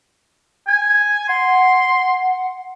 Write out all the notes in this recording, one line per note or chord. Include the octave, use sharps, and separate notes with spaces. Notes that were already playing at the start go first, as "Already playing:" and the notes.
G#5 G#6
F#5 C6